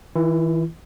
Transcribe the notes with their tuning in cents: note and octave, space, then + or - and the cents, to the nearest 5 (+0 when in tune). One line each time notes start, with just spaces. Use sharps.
E3 -35 E4 +35